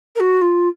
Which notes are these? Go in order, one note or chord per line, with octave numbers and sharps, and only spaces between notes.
A#4
F#4
F4